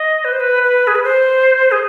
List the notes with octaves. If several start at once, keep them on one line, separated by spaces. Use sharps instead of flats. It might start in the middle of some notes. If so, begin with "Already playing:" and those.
Already playing: D#5
B4
C5
B4
B4
G#4
B4
C5
G#4